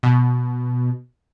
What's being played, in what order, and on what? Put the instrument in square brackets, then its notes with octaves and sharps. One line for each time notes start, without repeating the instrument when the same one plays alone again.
[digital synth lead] B2